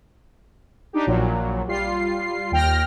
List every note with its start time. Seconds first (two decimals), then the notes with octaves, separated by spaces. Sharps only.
0.93 D4 D#4 G4
1.07 A#1 A#2 F#3
1.68 G3 F4 C7
2.52 D#2 G5 F6 A#6